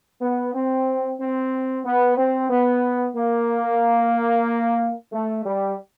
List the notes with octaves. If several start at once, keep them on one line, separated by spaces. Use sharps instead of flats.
B3
C4
C4
B3
C4
B3
A#3
A3
G3